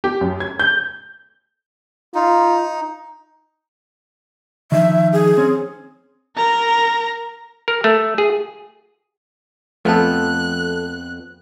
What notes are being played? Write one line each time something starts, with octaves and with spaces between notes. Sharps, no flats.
G4
F#2
G#6
G6
D#4 F4
D#3 F3 D#4 E5
G#4
C4 C#4
A#4 A#5
A#4
A3
G#4
F2 F3 A3 B3 A4 F#6